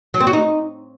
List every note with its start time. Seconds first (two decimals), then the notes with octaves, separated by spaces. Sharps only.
0.14 F#3
0.20 C4
0.27 F#4
0.33 D#4